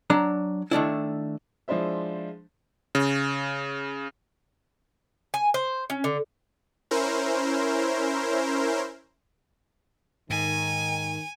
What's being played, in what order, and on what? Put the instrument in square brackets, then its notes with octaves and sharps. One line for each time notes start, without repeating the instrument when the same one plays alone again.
[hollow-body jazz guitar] F#3 D4 A#5
D#3 A3 D4 E4
[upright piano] F3 G#3 D4 E4 C5 E5
[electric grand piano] C#3
[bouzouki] G#5
C5
C#4
D3
[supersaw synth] C#4 E4 A#4 C5
[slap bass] G#2 [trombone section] D#3 [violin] G#5